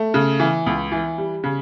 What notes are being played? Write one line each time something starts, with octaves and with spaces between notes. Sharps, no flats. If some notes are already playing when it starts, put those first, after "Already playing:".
Already playing: A3
C#3
E3
C#2
E3
G3
C#3